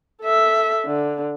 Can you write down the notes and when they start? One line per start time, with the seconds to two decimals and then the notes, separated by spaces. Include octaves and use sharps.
0.22 A4 E5
0.86 D3